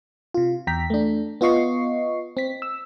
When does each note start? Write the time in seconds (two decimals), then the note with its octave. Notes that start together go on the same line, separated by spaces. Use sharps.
0.34 C3 F4
0.67 E2 G5 A#5 B6
0.90 A3 D4
1.41 B3 F4 D#5 C#6 C7
2.37 C4 B6
2.62 E6